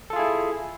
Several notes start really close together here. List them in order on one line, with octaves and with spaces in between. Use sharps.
A4 F4 G#4 E4